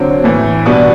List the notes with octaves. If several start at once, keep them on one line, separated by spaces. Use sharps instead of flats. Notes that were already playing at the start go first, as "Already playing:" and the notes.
Already playing: D3 F#3 C4
A2 E3 A3
B2 G3 B3 D4 F#4